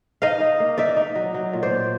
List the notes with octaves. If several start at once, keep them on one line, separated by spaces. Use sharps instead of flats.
D#4 D#5 F5
D#4
A#3
D#4 D5 E5
D#4
F#3
F#3
A#2
C5 D5
A#2